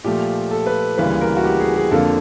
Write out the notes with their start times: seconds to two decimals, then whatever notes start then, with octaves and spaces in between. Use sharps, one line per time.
0.04 A#2 F3 A3 G4
0.51 A4
0.67 B4
0.98 D2 C#3 E3 G3 A#3 B4
1.21 A#4
1.37 F#4
1.44 G4
1.60 G#4
1.76 G#4
1.91 F2 D3 F3 A#3 A4